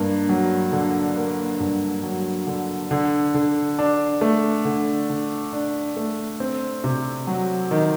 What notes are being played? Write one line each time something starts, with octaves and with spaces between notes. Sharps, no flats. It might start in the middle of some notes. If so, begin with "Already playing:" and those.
Already playing: G2 A#3
F#3
D3
A#3
G2
F#3
D3
D3
D3
D4
A3
D3
D3
D4
A3
C4
C3
F#3
D#3